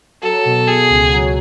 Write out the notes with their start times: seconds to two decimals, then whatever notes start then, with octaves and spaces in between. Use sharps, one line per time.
0.22 F#3 A4
0.45 B2
0.67 B2 G#4
0.90 C#2
1.12 F#3